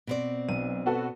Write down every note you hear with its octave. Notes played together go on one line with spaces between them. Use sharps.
B2 C4 D5
B1 D#7
B3 F#4 A4